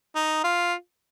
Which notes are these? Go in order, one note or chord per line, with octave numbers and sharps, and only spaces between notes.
D#4
F4